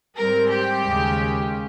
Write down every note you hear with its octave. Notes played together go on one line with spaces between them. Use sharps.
G#2 G3 C4 A#4
G4
D#2 C#3 G#3 C#4